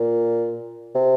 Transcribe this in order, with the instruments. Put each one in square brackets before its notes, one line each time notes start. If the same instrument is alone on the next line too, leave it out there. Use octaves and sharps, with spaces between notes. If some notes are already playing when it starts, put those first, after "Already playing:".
Already playing: [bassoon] A#2
C3